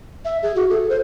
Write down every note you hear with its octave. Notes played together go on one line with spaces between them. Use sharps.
E5
G#4
F#4
A4
C5